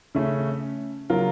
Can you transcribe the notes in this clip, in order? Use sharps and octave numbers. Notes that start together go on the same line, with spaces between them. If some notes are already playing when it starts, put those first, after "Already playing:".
C#3 A3 C#4
C#3 F#3 A#3 F4 A#4